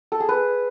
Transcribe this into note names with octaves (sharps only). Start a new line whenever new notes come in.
A4
G#4
B4